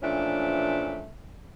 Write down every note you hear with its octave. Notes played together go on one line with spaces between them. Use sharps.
A#2 E3 F3 A3 C#4 D4